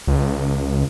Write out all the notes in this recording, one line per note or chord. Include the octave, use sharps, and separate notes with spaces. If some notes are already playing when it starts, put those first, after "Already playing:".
C#2